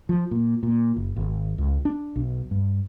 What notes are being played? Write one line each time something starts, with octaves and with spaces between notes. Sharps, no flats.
F3
A#2
A#2
F#1
G#1
C#2
D4
B1
G2